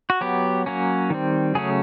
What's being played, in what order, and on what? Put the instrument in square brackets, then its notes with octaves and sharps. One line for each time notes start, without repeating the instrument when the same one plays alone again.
[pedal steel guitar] F#4
F#3 B3 G4
F#3 A#3 C#4
D#3 G3 C4
C#3 F#3 A3 C#4 G#4